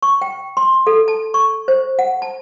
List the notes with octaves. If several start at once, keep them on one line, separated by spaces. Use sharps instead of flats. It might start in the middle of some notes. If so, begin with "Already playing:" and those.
C#6
G5
C6
A4
A5
C#6
C5
F#5
A5